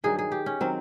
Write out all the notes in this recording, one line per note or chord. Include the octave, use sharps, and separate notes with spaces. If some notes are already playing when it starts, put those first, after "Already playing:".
G2 D#3 F#3 G#4
G#4
G4
C#4
D#3 F#3 C4